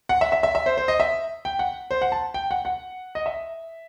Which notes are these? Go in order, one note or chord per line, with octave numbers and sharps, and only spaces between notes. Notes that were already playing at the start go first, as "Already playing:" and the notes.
F#5
E5
E5
E5
E5
C5
C5
D#5
E5
G5
F#5
C5
F#5
A5
G5
F#5
F#5
D#5
E5